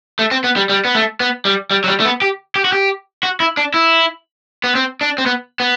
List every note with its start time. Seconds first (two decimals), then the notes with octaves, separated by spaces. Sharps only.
0.19 A3
0.31 C4
0.44 B3
0.56 G3
0.69 G3
0.85 B3
0.95 A3
1.20 B3
1.45 G3
1.71 G3
1.84 F#3
1.88 G3
2.00 A3
2.05 B3
2.22 G4
2.56 G4
2.65 F#4
2.72 G4
3.23 F#4
3.40 E4
3.57 D4
3.74 E4
4.64 B3
4.75 C4
5.01 D4
5.18 C4
5.26 B3
5.60 B3